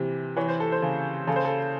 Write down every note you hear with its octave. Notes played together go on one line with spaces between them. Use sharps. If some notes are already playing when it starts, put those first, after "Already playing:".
Already playing: C3 E3
E3 C#5
C5
A4
C5
C#3
C#3 A4
C5
A4